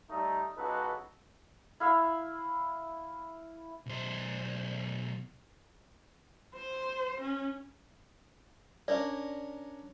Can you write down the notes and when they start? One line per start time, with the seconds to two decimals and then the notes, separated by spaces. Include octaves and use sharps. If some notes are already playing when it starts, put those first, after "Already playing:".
0.10 G3 A3 D#4
0.57 C#2 D#4 F#4 A4 B4
1.80 E4 F5 E6
3.86 B1 C5
6.55 C5
7.21 C#4
8.88 C#4 D4 A#4 D5